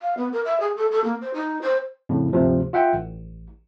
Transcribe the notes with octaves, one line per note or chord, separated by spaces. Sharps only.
F5
B3
A#4
E5
G#4
A4
A4
A#3
C5
D#4
C5
F2 A2 C#3
G1 D2 C3 F3
F4 E5 F#5 G5
A1